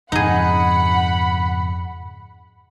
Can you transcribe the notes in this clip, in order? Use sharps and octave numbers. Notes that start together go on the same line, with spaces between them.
F2 G#2 C#3 D#4 G#4 F#5 B5